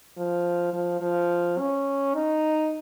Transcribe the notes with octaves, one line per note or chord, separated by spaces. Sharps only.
F3
F3
F3
C#4
D#4